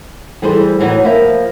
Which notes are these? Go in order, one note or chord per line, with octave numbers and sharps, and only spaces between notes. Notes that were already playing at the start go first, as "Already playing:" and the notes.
E3 G3 G#4 A4 C5
A2 E3 F#3 D#4
F3 A#3 B4 E5